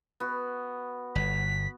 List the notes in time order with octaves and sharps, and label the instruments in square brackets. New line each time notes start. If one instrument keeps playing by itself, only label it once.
[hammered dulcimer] B3 F#4
[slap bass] G1 [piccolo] B6